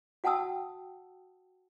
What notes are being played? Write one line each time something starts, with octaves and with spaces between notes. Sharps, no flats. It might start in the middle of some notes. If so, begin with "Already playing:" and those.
F#4 F#5 G5 A5 D#6 E6